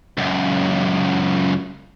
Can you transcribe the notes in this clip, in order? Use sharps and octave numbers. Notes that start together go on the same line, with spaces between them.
C#2 F#2